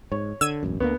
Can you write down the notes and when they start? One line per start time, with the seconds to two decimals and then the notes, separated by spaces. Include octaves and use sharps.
0.12 G#2 C#5
0.41 D3 E6 G#6 D#7
0.63 E1 A1 F#2
0.80 D2 D3 A#3 B3